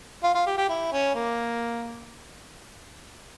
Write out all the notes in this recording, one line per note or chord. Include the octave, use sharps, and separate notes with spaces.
F4
F4
G4
G4
E4
C#4
A#3